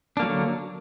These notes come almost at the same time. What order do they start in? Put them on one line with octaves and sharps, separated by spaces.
D4 A#3 F#3 D3